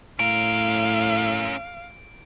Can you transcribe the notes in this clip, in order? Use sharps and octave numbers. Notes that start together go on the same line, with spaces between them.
A2 C#4 A#4 F5 D7